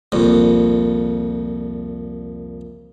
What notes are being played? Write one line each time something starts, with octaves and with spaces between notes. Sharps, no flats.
C2 F2 A#2